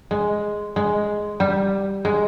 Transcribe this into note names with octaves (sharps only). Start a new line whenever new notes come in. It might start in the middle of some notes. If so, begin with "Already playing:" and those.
G#3
G#3
G3
G#3